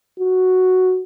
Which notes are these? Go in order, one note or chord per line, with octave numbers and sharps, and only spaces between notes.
F#4